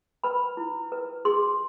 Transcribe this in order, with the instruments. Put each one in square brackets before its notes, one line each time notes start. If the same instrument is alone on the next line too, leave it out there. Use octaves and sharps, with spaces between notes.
[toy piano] B4 B5
E4
B4
G#4 C6